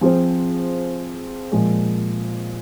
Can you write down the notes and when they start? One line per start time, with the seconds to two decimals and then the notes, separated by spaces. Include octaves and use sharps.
0.01 F3 C4 F4 G#4 C5
1.52 A#2 F3 G#3